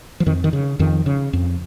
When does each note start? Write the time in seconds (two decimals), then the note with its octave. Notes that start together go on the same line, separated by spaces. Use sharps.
0.20 F3
0.26 F2 D#3
0.44 D#3
0.53 C#3
0.79 F2 D#3
1.06 C#3
1.33 F2